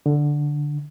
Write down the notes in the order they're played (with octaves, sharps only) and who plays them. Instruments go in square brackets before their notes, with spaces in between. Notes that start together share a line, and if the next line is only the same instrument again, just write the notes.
[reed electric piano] D3